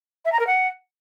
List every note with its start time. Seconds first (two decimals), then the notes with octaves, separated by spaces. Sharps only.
0.25 E5
0.32 A#5
0.39 A#4
0.47 F#5